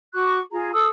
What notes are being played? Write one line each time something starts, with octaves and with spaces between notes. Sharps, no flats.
F#4 C#6 D6 F#6
F4 G#4 A#5
A4 D#6 E6